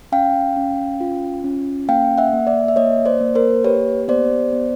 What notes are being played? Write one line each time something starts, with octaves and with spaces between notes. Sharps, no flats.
C#4 F5 G5
C#4
F4
C#4
A#3 F5 G5
E5 F#5
A#3
D5 E5
E5
A#3 C#5 D#5
C5 D5
A#3
A#4 C5
G4 B4 C#5
B3 C5 D5
B3